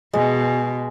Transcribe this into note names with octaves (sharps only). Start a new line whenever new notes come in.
B2 G#3